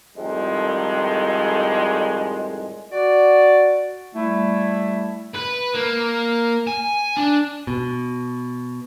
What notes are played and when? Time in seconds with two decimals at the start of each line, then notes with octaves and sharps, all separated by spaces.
0.16 F2 A2 D#3 G3 G#3
2.92 F#4 D5
4.15 G3 A3 E4
5.35 B4
5.75 A#3
6.67 G#5
7.17 D4
7.67 B2